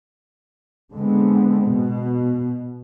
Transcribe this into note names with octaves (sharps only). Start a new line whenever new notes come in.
D3 G#3 B3 C4
B2